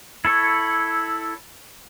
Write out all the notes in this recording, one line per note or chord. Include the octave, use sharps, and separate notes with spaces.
E4 A4 C#5